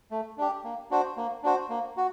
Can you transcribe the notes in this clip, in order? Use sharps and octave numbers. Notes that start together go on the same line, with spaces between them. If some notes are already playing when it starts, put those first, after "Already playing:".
A3
D4 G4
A#3
D4 F#4 C5
A#3
D4 F#4 C5
A#3
F#4